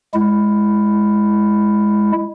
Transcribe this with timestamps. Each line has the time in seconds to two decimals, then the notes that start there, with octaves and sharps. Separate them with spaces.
0.14 G#3 E4